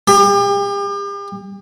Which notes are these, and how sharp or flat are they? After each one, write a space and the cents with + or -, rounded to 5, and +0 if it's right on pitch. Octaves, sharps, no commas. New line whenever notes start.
G4 +40